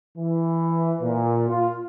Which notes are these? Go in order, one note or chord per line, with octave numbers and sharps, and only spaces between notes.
E3
A#2
F4